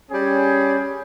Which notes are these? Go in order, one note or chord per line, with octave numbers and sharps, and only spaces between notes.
G3 C#4 G4 G#4